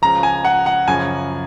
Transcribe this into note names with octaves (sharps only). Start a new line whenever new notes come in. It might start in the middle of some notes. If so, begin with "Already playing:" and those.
C#2 C#3 F3 A#5
G#5
F#5
F#5
F#2 C#3 F3 G#5